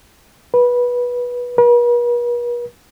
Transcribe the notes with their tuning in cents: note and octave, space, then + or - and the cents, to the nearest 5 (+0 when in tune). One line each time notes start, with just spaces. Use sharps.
B4 -15
B4 -45